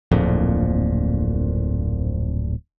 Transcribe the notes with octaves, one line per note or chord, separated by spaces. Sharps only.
D1 A#1 F2 A#2